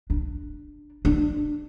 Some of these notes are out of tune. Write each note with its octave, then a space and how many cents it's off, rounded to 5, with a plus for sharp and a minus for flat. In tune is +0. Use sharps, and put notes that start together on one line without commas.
D4 +10
D4 +20